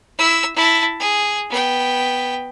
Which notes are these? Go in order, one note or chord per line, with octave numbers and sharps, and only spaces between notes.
E4 E6
E4 A5
G#4
B3 G5